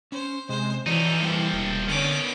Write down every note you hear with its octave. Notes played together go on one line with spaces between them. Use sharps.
C#4 C5
C3 G#3 C5
E3 F3 D#4 F#4 A4 C#5 D5
C3 F3 G3 A#3 G5
E1
B2 D3 D#3 C#4 D6